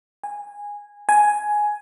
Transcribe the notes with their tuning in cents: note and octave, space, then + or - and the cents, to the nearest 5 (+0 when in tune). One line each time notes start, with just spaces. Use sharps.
G#5 -15
G#5 +10